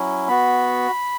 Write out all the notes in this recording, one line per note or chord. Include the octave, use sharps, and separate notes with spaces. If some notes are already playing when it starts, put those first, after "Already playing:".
Already playing: F#3 C#4 E4
B3 F#4 B5